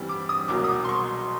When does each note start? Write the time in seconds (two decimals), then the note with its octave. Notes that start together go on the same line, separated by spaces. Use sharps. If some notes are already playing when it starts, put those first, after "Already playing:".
Already playing: G2 E3 G3 C4
0.09 D6
0.29 D#6
0.48 C2 B2 F#3 A#3 D6
0.64 D#6
0.68 D6
0.85 C6
0.89 C#6